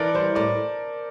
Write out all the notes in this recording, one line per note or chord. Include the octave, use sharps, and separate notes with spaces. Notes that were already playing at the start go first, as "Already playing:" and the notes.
Already playing: E3 A4 A#4 D5
G3 C5
A2 D5